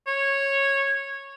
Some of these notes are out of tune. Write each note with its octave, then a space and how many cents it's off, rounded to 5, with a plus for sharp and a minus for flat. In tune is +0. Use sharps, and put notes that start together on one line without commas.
C#5 -10